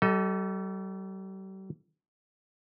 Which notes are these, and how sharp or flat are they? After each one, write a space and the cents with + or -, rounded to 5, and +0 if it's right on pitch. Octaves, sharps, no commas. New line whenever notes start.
G3 -40 A4 +0 D#5 +25